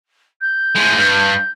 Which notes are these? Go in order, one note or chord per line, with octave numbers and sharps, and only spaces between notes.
G6
A2 G#3
G2